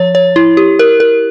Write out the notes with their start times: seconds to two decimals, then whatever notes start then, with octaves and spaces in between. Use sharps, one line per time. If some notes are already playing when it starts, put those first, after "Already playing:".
Already playing: F3 C#5
0.15 C#5
0.36 E4
0.57 G4
0.79 A#4
1.00 A#4